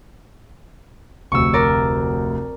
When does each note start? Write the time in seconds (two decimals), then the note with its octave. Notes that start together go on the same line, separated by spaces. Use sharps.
1.32 F1 D2 C#6 E6
1.53 A#4 D5